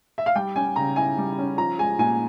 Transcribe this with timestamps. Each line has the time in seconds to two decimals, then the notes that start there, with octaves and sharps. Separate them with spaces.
0.18 E5
0.26 F5
0.35 G3 G5
0.56 C#4 G#5
0.76 C#3 A#5
0.96 E4 G#5
1.18 G3
1.38 C#4
1.58 F3 A#5
1.78 G#3 G#5
1.99 A#2 G#5